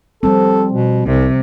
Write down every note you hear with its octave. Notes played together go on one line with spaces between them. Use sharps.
F3 G3 C4 A4
B2
C2 C3